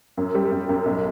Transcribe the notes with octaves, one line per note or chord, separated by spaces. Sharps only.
F#2
G3
F#2
F#2
B1